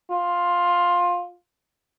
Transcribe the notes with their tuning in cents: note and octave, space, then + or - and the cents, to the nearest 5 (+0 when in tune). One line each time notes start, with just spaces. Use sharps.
F4 +10